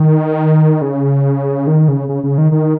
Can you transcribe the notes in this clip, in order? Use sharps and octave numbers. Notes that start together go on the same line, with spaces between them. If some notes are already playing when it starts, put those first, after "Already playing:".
Already playing: D#3
C#3
D#3
C#3
C#3
C#3
D#3
D#3